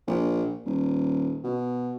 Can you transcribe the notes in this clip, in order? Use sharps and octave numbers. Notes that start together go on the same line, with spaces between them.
A#1
D#1
B2